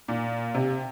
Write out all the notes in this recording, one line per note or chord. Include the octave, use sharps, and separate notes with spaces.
A#2
C3